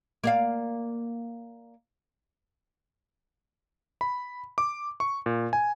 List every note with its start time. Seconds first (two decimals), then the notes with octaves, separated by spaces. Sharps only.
0.24 A#3 D5 F5
4.01 B5
4.58 D6
5.00 C#6
5.26 A#2
5.53 G#5